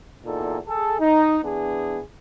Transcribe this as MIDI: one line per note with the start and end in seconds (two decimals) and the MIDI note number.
0.25 0.58 40
0.25 0.58 46
0.25 0.58 63
0.25 0.58 69
0.67 0.95 68
0.67 0.95 69
1.00 1.38 63
1.43 2.00 52
1.43 2.00 59
1.43 2.00 62
1.43 2.00 68